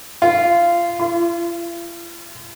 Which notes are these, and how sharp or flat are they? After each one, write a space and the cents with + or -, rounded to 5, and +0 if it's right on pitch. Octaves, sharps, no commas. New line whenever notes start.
F4 -20
F4 -45